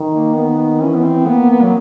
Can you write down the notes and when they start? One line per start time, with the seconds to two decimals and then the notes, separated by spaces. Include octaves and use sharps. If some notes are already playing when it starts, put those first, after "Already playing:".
Already playing: D#3
0.12 A#3
0.35 D#3 B3
0.58 B3
0.81 E3 C#4
0.96 B3
1.04 C4
1.27 A#3 B3
1.50 B3
1.63 F#3